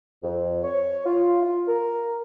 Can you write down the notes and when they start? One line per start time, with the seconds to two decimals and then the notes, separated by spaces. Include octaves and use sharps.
0.23 F2
0.64 C#5
1.06 F4
1.42 F4
1.68 A#4